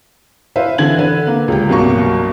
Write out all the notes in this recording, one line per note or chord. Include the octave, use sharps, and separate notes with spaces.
E4 B4 C5 E5 F5
D3 E3 G#6 F#7
D3 B4
A#3
C#2 G4
C2 G2 B2 F#3 A#3 C#6